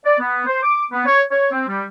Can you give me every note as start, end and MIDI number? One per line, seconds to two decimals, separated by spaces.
0.04 0.18 74
0.19 0.44 59
0.46 0.61 72
0.63 0.84 86
0.92 1.03 59
1.06 1.21 73
1.30 1.48 73
1.51 1.65 60
1.68 1.84 55